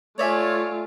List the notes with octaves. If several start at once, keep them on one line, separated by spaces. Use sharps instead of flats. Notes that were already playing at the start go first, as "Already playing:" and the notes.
A3 F4 C#5 D5 E5 G#5